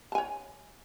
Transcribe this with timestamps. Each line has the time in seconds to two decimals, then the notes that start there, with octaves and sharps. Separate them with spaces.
0.12 A5
0.15 G#5
0.18 C#5